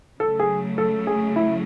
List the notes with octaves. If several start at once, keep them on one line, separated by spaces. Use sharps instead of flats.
C#3 F#3 A3 A4
G#4
A4
G#4
E4